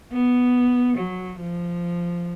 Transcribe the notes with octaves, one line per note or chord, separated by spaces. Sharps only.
B3
F#3
F3